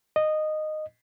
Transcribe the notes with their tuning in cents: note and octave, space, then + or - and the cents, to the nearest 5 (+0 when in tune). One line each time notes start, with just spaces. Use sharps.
D#5 -10